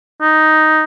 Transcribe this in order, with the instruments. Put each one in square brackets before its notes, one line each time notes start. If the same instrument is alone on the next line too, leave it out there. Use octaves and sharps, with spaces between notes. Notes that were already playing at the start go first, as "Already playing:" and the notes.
[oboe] D#4